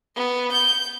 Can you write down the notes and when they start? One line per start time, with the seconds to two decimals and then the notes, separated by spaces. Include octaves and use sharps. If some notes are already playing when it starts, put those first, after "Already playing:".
0.16 B3
0.52 G6